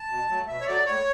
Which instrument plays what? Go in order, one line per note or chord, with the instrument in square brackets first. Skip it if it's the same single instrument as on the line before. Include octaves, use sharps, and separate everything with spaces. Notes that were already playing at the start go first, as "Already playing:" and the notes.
Already playing: [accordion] A5
B2
F#3 A3
B2 E5
C#5
F#3 A3 D5
A2 C#5